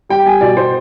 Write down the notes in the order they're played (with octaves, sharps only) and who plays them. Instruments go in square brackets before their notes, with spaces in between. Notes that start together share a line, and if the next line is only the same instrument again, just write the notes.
[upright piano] G3 G5
G3 G#5
B2 D5
B2 C5